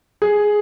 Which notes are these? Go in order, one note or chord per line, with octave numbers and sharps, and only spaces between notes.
G#4